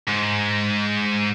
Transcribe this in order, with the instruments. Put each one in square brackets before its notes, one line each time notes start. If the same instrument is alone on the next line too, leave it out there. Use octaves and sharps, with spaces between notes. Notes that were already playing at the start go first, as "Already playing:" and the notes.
[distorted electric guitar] G#2